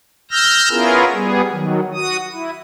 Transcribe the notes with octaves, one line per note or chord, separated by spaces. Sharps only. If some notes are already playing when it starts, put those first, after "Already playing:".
E6 F6 G6 A#6
B3 C#4 E4 F4 G#4 A#4
G3 B3 G#4
D#3 F#3
F#4 D#6
E4